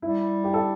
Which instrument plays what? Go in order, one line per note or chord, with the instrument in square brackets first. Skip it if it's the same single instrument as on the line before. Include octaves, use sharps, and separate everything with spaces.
[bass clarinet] G3 [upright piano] E4
[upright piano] G4
A4